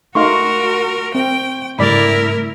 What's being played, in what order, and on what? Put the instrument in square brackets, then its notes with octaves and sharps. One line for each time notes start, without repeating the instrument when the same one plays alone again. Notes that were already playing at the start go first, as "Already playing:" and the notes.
[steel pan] A3 D#4 F5 [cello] F#4 A#4 [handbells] C6 C#6
[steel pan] C4 [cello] G5
[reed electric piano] G#2 C#3 A3 [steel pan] G3 D5 B5 [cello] E4 A#4